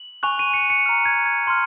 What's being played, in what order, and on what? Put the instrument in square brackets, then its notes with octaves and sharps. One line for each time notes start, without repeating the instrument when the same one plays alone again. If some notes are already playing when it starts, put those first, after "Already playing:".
Already playing: [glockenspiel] F#7
G#5 C#6 F#6 F7
D#7
C#7
C#7
A#5 F6
G#6
G#6
C6 F6